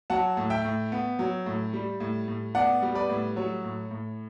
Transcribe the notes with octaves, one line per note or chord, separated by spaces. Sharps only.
F#3 F#5 A5
A2
E5 G5
A2
B3
F#3
A2
G3
A2
A2
B3 D5 F#5
G3
B4 D5
A2
F#3 C#5
A2
A2